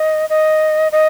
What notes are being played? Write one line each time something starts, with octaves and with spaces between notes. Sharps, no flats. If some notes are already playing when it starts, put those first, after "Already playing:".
Already playing: D#5
D#5
D#5